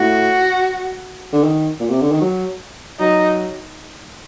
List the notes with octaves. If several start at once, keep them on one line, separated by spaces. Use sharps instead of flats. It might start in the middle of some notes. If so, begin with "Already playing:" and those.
Already playing: A2 F#4
D3
D#3
A#2
C3
D3
D#3
F#3
F#3 D#4